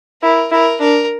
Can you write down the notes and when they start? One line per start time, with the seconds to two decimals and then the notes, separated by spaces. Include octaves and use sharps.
0.23 E4 A#4
0.52 E4 A#4
0.80 D4 A#4